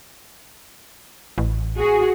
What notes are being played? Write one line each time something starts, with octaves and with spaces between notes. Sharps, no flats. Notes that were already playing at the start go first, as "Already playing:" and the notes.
A1
F#4 G#4